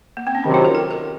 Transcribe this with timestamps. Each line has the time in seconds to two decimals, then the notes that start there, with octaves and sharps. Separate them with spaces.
0.17 A#3
0.27 C4
0.35 C#4
0.44 C3 D#3 F#3 C4 D#4
0.54 F4
0.65 A#4
0.75 A4
0.91 A#4